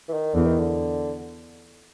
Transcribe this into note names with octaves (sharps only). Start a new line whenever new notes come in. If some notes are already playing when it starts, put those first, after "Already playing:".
E3
D#3
E2 D3
D#3
D3